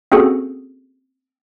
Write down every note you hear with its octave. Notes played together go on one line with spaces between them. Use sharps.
A#3 C4 C#4 F#4 G#4 A4